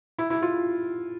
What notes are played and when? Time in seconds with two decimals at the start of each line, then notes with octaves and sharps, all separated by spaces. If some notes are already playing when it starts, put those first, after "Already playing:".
0.18 E4
0.30 E4
0.42 F4